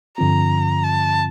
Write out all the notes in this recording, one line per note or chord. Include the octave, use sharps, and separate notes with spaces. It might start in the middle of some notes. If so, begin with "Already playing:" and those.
G2 D3 F3 C4 F4 A#5
A5